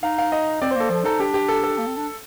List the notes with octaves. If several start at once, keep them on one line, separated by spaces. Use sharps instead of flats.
D#4 F5
F5
D#5
C4 D5
C5
A#3 A4
F3 A4
D#4 A4
D4 G4
G4
A4
A4
A#3
C4
D4